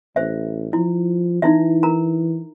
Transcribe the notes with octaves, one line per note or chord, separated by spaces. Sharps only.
A1 C5 E5
F3 E4
E3 D#4 E4 E5
A#4 A#5